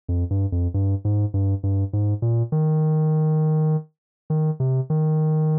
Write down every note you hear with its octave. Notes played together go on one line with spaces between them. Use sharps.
F2
G2
F2
G2
G#2
G2
G2
G#2
A#2
D#3
D#3
C3
D#3